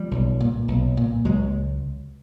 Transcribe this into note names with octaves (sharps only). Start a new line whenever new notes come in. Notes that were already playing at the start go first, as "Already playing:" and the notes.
Already playing: F3 G3
B1
A#2
B1
A#2
C#2 F#3 G#3